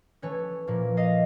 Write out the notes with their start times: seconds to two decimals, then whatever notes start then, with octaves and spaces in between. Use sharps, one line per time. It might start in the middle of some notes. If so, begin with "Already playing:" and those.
0.22 E3 A3 C#4 B4 C#5
0.67 A#2 F3 A#3
0.97 D#5 F5